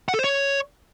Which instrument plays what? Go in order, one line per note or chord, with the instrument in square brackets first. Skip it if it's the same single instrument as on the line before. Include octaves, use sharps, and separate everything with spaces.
[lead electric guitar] F#5
A4
C5
C#5